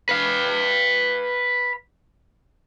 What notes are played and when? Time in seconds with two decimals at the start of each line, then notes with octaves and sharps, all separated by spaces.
0.09 B4 F5